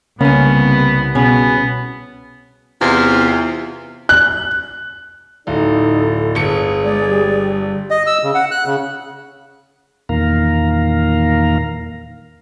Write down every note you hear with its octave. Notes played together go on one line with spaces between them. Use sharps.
C2 C#3 A#3 B3 C#4
B2 B3 C#4 G#4
E2 C3 F4
F#6
D1 D#4 A4 D5
G1 G#4 C#7
G#3 D5
G3
D#5
E6
C#3
F#5
F#6
C#3
E2 A#2 D#3 A#3 F5 A#5